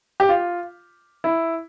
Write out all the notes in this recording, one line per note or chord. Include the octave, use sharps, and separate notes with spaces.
G4
F4
E4